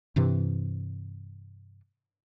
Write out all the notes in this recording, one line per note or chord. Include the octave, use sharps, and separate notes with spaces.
G2 C3 E3